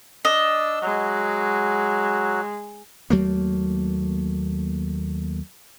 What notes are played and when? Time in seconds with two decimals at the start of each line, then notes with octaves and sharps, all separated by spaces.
0.25 D4 D#5 A5 E6
0.82 F#3 G#3 F#4
3.10 D#2 F#3 A3 A#3